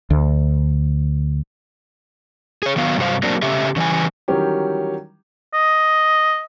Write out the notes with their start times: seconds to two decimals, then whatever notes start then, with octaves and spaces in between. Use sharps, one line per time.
0.10 D2
2.63 G#4 C#5
2.76 D#3 F#3 B3 F5
2.98 G2 C3 F#3 C5 F5
3.23 F#3 A#3 C4 D4
3.42 C#3 A3 G4 E5
3.76 C#3 E3 G3 G#5
4.28 D#3 E3 F#3 G3 C#4 G4
5.54 D#5